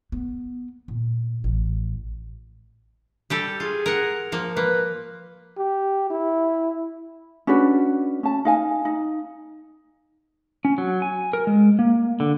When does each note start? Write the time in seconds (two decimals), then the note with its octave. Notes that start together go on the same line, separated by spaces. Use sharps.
0.12 B3
0.88 A#2
1.44 A1
3.30 G3 G4 A4
3.60 F4 G#4
3.86 A#4 F#5
4.32 F3 A#3
4.57 A#3 B4
5.58 G4
6.10 E4
7.47 C#4 D4 F#4 B4
8.23 C#4 A5
8.45 D#4 F5 G#5
8.85 D#4
10.65 C#4
10.78 F#3
11.02 G#5
11.33 A#4
11.47 G#3
11.79 A#3
12.20 D3